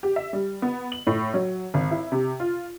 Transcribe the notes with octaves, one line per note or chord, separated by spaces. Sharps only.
G4
E5
G3
B3
F#7
A2
F#3
G#1
E4
C3
F4